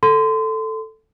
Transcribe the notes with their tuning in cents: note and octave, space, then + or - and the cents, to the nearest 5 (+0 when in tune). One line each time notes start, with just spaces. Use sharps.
A4 +0 C6 -30